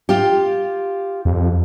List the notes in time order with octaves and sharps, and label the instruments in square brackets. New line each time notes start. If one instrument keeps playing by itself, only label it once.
[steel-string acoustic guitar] F4 G4
[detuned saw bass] F2